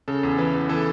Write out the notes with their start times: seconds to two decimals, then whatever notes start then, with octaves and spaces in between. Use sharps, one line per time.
0.08 C#3 A4
0.23 E2
0.38 E3 B4
0.54 E2
0.69 E3 A4